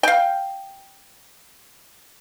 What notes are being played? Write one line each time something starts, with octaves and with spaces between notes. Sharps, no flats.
F5 G5